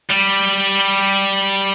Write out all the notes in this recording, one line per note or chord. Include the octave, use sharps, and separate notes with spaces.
G3